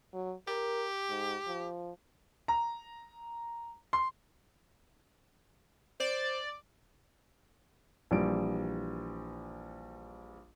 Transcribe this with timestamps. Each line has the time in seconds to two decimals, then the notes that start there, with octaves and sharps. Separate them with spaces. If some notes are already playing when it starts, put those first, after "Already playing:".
0.14 F#3
0.48 G4 A#4
1.09 G#2
1.47 F3
2.48 A#5
3.93 C6
6.00 C5 D5
8.11 A#1 E3 G3 A#3 D7